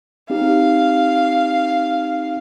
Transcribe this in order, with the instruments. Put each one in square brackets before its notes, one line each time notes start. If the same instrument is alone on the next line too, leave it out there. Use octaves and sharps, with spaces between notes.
[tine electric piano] C4 D#4 G4 [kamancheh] F5